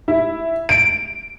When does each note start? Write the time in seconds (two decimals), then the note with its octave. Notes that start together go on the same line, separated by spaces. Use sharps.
0.08 E4
0.69 D7